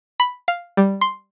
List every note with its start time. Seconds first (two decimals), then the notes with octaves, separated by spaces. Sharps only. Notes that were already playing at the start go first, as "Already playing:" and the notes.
0.20 B5
0.48 F5
0.77 G3
1.01 C6